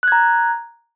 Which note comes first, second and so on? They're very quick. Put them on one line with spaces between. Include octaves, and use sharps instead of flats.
F#6 G#6 A#5